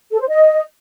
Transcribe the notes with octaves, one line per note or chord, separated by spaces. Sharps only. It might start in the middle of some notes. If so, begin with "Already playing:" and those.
A4
C5
D#5